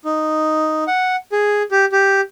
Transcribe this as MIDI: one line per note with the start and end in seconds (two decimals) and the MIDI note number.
0.05 0.84 63
0.87 1.16 78
1.32 1.62 68
1.71 1.85 67
1.92 2.21 67